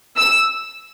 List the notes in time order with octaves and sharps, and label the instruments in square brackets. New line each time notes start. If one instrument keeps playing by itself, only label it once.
[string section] E6